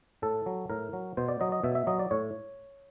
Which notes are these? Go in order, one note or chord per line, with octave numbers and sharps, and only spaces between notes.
A2 A4
F#3
A2 A#4
F#3
B2 C5
D5
F#3 D#5
D#5
B2 E5
E5
F#3 D#5
D5
A2 C#5